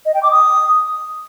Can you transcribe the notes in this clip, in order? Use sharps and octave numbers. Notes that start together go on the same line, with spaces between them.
D#5
G5
D6
D#6